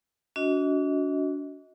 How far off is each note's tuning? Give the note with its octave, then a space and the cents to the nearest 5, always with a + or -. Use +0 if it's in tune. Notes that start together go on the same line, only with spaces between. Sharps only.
D4 -40 F#4 -10 D#5 +30